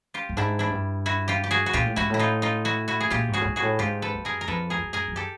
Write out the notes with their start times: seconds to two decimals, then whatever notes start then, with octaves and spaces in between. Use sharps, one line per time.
0.14 F4 G4
0.29 G2
0.37 G#2 D4 E4
0.59 D4 E4
0.71 G2
1.06 E4 F#4
1.28 F4 G4
1.44 G4
1.51 F#4 G#4
1.66 F#4
1.73 A#2 F4 G4
1.86 A2
1.96 G#2 E4 F#4
2.10 A2 E4
2.19 D#4 F4
2.42 D#4 F4
2.65 E4 F#4
2.88 E4 F#4
3.00 G#4
3.10 A#2 F4 G4
3.28 G#2
3.34 F#4 G#4
3.41 A2
3.45 G#2
3.56 F#4 G#4
3.62 A2
3.79 G#2 F4 G4
4.02 A4 B4
4.14 F#2
4.25 G#4 A#4
4.41 A#4
4.48 F2 A4 B4
4.70 G#4 A#4
4.83 F#2
4.93 G#4 A#4
5.08 F#2
5.16 G4 A4